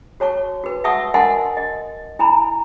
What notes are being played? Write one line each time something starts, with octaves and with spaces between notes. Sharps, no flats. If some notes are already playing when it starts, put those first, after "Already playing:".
F#4 C#5 A5 C#6
F#4 B4
E5 F#5 A5 C#6 D#6 E6
A#4 D#5 F#5 G#5 A5 C6
D#5
E4 G#5 A#5 B5